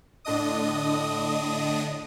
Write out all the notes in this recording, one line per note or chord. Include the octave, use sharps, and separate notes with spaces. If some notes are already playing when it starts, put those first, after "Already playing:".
A2 D3 D4 D#5 D#6